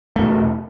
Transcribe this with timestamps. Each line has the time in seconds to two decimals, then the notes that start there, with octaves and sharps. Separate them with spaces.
0.16 A3
0.19 E2
0.22 B2